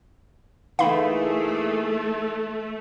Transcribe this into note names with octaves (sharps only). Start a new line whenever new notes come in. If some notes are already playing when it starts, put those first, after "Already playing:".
E3 A3 A#3 D#4 E4 G#4 F5 B5